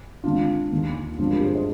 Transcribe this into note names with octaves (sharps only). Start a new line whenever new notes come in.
G#1 G#2 D#3 D4 F4
D#2 D#3
G#1 G2 D3 F3 D4 F4
G4 A#4
G#4 C5
C5 D#5